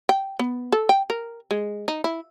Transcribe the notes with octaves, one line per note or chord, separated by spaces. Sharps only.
G5
B3
A4
G5
A#4
G#3
D#4
E4